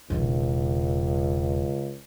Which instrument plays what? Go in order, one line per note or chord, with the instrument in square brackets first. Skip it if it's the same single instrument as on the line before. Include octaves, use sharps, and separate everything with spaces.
[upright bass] E1 D#3 [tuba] C#2